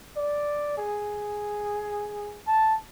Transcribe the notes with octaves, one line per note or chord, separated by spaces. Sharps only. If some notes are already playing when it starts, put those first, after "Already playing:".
D5
G#4
A5